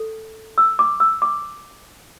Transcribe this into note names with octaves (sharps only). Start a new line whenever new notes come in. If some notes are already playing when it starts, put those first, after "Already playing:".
Already playing: A4
E6
D6
E6
D6